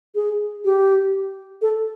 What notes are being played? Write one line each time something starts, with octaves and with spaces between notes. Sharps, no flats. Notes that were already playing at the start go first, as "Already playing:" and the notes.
G#4
G4
A4